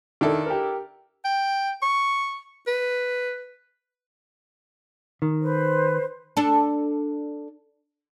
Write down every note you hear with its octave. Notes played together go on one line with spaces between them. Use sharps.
D#3 D4 E4 A4
G4 A#4
G5
C#6
B4
D#3
B4 C5
D4 A4